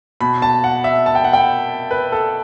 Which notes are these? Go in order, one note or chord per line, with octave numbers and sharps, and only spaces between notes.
B2 B5
A5
F#5
E5
A5
G5
F#5
G5
B4
A4